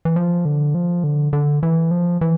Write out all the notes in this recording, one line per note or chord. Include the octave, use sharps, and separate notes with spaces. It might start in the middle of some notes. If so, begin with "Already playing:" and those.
E3
F3
D3
F3
D3
D3
E3
F3
E3